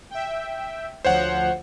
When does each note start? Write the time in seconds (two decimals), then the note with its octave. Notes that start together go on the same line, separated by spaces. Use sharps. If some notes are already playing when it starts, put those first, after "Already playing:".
0.10 E5 G5
1.05 D2 F3 C5 C#5 F#5